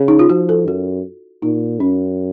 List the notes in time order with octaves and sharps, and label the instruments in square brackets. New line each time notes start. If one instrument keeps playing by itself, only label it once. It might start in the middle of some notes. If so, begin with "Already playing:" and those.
Already playing: [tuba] C#3
[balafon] D#4
F4
[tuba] F3 [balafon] F#4
[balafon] A4
[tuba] F#2 [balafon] F#4
[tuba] A#2 [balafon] D#4
[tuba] F#2 [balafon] C#4